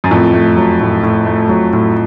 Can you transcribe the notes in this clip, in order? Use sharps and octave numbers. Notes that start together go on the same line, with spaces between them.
F#2
F2 A2
A3
F#3
A2
A2
A3
F#3
A2